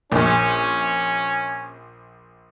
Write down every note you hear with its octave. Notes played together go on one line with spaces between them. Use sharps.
A#1 C#4